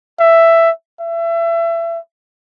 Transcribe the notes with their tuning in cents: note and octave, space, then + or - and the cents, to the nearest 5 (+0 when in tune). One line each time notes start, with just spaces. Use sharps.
E5 +10
E5 +30